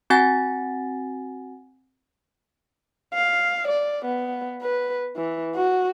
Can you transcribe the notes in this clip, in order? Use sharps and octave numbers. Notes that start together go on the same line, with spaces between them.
C4 F#4 F#5 G#5 A6
F5
D5
B3
B4
E3
F#4